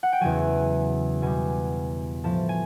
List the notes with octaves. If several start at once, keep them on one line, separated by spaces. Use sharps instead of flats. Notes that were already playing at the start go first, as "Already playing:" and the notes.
F#5
G5
E2 C#3 F#3 G#5
B2 G3 G#5
A2 F3 A5
G#5